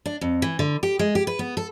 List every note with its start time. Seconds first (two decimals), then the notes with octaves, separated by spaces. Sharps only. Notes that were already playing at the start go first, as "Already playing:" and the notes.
0.06 D4
0.21 F2
0.42 E3
0.59 D3
0.83 G4
0.99 G#3
1.15 G4
1.27 B4
1.39 B3
1.57 A4